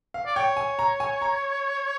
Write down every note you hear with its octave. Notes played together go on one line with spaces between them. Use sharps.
F5
D5
C#5 G5
G#5
A#5
G#5
A#5